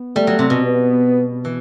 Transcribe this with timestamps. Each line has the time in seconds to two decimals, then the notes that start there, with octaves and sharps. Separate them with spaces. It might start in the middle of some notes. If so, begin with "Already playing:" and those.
Already playing: B3
0.16 G3 A3
0.27 F#3
0.39 C3
0.50 B2
0.62 B3
1.45 E3